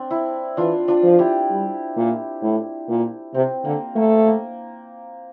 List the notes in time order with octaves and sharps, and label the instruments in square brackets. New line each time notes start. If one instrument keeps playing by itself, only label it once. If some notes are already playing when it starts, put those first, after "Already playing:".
Already playing: [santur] C4 D4
E4
[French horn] E3 [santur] D4 F4
[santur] D4 F4
[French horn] F3
[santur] E4 G4
[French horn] G3
A#2
A2
A#2
[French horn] C3 [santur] C4
[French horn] D3 [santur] A#3
[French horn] A3 [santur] A#3
[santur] A#3